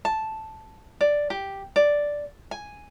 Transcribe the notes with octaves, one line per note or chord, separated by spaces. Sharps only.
A5
D5
G4
D5
G#5